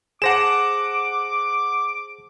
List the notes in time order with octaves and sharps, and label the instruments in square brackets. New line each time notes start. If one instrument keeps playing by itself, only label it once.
[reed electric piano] G#4 C5 A5 [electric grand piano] F#5 A#6 E7 [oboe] D6